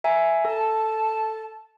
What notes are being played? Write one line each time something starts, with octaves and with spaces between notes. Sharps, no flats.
E5 G#5 A#5
A4 A5